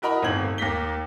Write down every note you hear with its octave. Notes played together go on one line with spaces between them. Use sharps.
E4 F#4 A#4 D#5 A#5 B5
D1 G1 D#3 C4 G#6 F#7
D#2 A#3 A#6 B6 G7